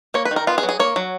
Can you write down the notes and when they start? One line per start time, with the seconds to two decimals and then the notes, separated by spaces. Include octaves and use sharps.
0.14 A#3 C#5
0.25 B4
0.31 D#3
0.36 A#4
0.47 B3 F4
0.58 G#4
0.63 F#3
0.69 G#4
0.79 A#3 C#5
0.96 F#3